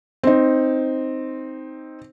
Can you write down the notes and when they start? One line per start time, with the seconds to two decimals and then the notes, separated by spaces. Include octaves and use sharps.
0.23 C4 D#4